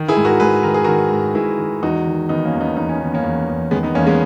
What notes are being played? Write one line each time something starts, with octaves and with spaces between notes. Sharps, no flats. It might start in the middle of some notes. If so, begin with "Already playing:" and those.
Already playing: D#3
E4 G#4
G#2
F#4 A#4
G#2 G#4 B4
D#3 A#4
G#4
D#3 F#4 A#4
G#2
G#2 E4 G#4
D#3
E2 D#4 F#4
D#3
D#3 B3 D#4
A#3 C#4
E2
B3 D#4
E2 D#4
C#4
D#3 B3
A#3 C#4
E2
E2
D#3 G#3 B3
B3 D#4
E2 A#3 C#4
G#3 B3